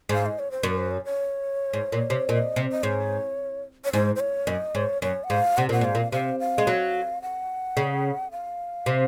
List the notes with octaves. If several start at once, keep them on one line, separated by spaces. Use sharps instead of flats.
G#2 F5
D#5
C#5
C5
F#2 A#4
C5
C#5
C#5
G#2
A#2
C3
A#2 D#5
C3
D#5
G#2 C#5
C#5
G#2 C5
C5
C#5
F#2 D#5
G#2 C#5
F#2 C#5
F#5
G#2 F5
C3 F#5
A#2 F#5
G#2 F5
A#2
C3 F5
F5
G#3
F#3
F#5
C#3
F5
C3